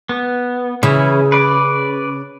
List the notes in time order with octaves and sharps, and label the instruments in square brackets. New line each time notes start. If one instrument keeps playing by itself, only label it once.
[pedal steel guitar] B3
[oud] C#3 [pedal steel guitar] E3 C#4 E4
[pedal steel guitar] B4 D5